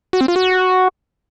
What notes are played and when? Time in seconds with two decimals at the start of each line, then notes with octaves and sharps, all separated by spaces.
0.13 F#4
0.21 C4
0.28 F4
0.36 F#4